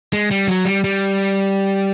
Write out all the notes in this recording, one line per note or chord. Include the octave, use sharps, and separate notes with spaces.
G#3
G3
F#3
G3
G3